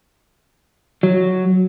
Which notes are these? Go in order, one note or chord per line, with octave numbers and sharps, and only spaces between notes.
F#3